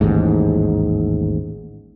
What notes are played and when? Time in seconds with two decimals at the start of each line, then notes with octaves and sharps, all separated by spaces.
0.01 A1 D#2 G#2